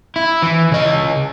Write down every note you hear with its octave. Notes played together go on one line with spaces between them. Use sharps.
E4
E3
C#3 D#5